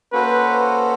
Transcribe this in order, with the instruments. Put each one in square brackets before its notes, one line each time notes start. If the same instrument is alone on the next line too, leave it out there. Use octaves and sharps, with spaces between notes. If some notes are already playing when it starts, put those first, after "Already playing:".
[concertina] A#3 C#4 F#4 A4 C5 [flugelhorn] B4